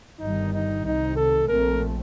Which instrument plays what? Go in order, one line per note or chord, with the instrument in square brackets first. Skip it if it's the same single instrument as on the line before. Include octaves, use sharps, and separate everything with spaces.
[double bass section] G1 G2 D#3 G3 [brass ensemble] D#4
[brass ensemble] D#4
[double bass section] C2 C3 D#3 [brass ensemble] D#4
[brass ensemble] A4
[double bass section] A#1 A#2 A3 C4 [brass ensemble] A#4